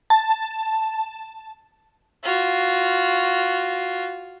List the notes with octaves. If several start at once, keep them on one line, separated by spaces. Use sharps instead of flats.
A5
F4 F#4